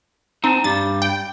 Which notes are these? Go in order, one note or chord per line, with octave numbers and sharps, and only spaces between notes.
C4 D#4 A5
G2 G3 A6
G5